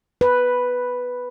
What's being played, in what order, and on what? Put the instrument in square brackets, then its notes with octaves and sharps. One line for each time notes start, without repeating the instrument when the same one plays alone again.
[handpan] B4